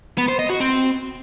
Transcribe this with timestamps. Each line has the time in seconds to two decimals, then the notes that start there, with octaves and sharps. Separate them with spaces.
0.18 B3
0.29 C5
0.39 D#5
0.50 F#4
0.60 C4